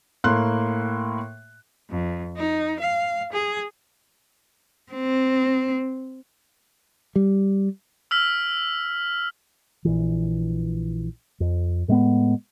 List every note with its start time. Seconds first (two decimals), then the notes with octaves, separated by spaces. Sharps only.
0.24 A2 A#3 C6 F#6
1.90 F2
2.36 D#4
2.80 F5
3.33 G#4
4.93 C4
7.16 G3
8.11 E6 F6 B6
9.85 A#1 E3
11.40 F2
11.88 A2 G#3 A3 B3